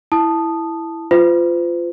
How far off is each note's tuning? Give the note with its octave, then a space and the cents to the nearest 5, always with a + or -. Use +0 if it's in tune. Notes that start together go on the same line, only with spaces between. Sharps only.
E4 +0 A5 +0 D#6 -15
F4 -10 C5 -45